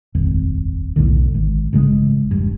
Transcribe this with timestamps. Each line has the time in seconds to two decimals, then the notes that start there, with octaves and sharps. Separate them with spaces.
0.15 D#1 G#1 F2
0.96 B1 E2 A2 D3
1.35 G#1
1.73 A1 G2 C#3 G#3
2.31 E1 G2